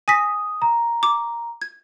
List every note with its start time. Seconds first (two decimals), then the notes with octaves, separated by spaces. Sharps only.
0.08 G#5 D#6 A#6 B6
0.62 A#5
1.03 D6
1.62 G#6